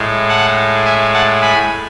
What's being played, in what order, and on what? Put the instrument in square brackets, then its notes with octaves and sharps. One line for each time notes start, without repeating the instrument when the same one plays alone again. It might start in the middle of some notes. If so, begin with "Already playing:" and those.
Already playing: [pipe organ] A2 G#3
F#5 A5
E5 G#5
F#5 A5
G#5 B5